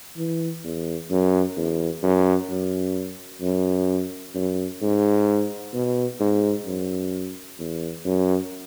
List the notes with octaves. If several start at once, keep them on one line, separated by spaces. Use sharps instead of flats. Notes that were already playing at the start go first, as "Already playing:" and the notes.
E3
E2
F#2
E2
F#2
F#2
F#2
F#2
G#2
B2
G#2
F#2
E2
F#2